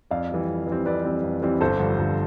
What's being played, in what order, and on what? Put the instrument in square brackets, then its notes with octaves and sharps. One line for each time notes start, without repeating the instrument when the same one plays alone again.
[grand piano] F2 D5 F5
E3 G3 C4
F2
E3 G3 C4
F2 B4 D5
E3 G3 C4
F2
E3 G3 C4
G1 A4 C5
G2 D3 F3
G1